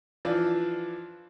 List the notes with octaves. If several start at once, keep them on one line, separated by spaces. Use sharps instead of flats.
E3 F3 D4 F4